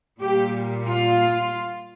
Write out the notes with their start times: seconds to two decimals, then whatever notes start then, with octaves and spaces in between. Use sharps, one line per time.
0.20 A#2 G3 G4
0.84 F4